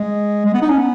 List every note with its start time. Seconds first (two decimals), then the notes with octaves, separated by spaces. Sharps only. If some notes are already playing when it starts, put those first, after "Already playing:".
Already playing: G#3
0.45 G#3
0.54 B3
0.62 D#4
0.69 C#4
0.78 B3